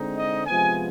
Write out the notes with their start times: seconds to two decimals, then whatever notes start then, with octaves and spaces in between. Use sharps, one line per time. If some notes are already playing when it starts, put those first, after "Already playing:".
Already playing: D3 G#3 C4 D#4
0.17 D#5
0.46 C3 F3 G#3 B3 G#5